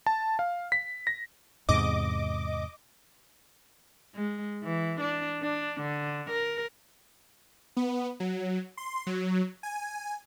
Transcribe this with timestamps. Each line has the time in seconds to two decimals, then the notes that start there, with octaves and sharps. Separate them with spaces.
0.06 A5
0.39 F5
0.72 B6
1.07 A#6
1.69 E2 G#2 C3 D#5 D6
4.14 G#3
4.63 E3
5.00 D4
5.42 D4
5.81 D3
6.30 A#4
7.77 B3
8.20 F#3
8.77 C6
9.07 F#3
9.63 G#5